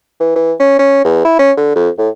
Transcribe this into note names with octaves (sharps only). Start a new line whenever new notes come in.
E3
E3
C#4
C#4
E2
E4
C#4
D3
F2
A2